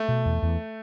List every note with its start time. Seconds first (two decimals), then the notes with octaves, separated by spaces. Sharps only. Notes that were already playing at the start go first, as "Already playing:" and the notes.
Already playing: A3
0.08 B2
0.25 E2
0.42 E2